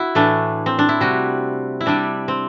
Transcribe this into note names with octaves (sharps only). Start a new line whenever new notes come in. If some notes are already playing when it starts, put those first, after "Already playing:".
Already playing: E4 F#4
A2 E3 A3 D4
C4
D4
E4
C3 G3 F#4
E4
C3 G3 D4
C4